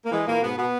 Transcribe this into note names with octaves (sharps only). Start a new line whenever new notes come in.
A#3
E3 G#3
A#2 E3 A#3
G#2 B2 B3
B2 B3